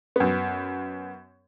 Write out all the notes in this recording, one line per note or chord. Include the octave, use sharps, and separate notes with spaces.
F#2 B3